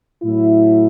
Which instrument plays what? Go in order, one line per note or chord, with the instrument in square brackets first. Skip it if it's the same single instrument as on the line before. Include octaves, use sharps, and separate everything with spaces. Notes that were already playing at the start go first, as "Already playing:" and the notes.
[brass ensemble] A2 F#3 A3 E4